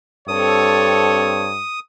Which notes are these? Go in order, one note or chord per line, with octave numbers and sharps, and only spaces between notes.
G2 C4 A4 C#5 D#6